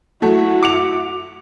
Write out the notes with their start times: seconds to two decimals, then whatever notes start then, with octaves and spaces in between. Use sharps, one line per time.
0.22 F#3 A3 E4 F#4
0.63 D6 C#7 F7